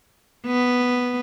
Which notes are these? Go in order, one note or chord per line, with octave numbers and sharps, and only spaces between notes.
B3